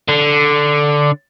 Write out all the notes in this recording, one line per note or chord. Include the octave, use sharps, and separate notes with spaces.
D3